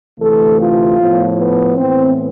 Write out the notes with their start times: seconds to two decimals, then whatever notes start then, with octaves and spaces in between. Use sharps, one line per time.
0.19 D2 C3 E3 A3 A4
0.59 F4
0.98 A2 F3 B3
1.36 B3
1.76 A2 E3 B3 C4